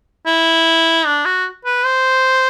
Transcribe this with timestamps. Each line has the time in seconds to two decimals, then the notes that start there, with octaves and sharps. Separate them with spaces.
0.26 E4
1.06 D4
1.25 F#4
1.65 B4
1.85 C5